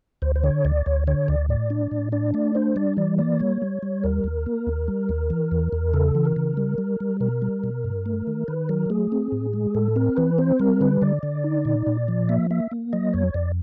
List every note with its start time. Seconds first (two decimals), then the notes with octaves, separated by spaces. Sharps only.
0.22 D2 C5
0.36 C5
0.44 D3 C#5
0.65 D2 D5
0.86 D2 C#5
1.07 D3 C#5
1.28 D2 D5
1.49 A2 D5
1.70 D4
1.91 A2
2.12 D4 D5
2.34 A3 D5
2.55 D4 C5
2.76 G3 D5
2.97 E3 D5
3.18 A#3 D5
3.40 G3 C#5
3.62 G3
3.83 G3
4.04 D#2 A#4
4.24 D#2
4.46 A#3
4.67 D#2
4.88 G3
5.09 D#2
5.30 E3
5.51 E2
5.72 E2
5.94 C#3 A4
6.15 E3
6.25 A#4
6.36 C#3
6.57 G3
6.78 G3
7.00 G3
7.20 B2 A#4
7.42 G3
7.64 B2
7.84 G2
8.06 A3
8.27 D#3
8.48 D#3 B4
8.69 F#3 A#4
8.90 A3 G#4
9.12 C4
9.32 A2
9.53 G#3
9.75 A2 A4
9.96 C4 A#4
10.17 E3 B4
10.38 C4 C5
10.60 G3 A#4
10.81 D3 B4
11.02 D3 D5
11.23 D3
11.44 D#4
11.65 A#2
11.87 A#2
12.08 F3
12.29 A#3 E5
12.50 A#3 E5
12.71 A#3
12.93 F#3 D#5
13.13 F2 C#5
13.34 F2 D5